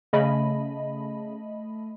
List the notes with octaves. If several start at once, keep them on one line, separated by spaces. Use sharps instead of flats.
C#3 A3 D#5 B5